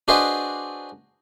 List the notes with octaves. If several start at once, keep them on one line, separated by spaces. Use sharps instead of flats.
D4 F#4 G#4 B4 C5 D#5